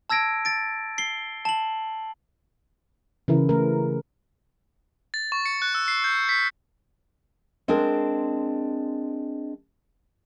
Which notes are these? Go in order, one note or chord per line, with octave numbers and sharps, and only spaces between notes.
A5 E6 G#6 A#6 D7
A6 D7
C7 G7
A5 F#7
C#3 E3 E4 A#4
A3 A#4
A6
C#6
C#7
F#6
E6
C7
G6
B6
G#3 C4 D4 G#4 A#4